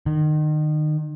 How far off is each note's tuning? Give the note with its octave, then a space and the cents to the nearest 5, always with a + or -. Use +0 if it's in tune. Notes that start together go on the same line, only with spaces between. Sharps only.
D#3 -30